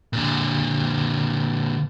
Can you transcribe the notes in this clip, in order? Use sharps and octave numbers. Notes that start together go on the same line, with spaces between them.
A#2 D3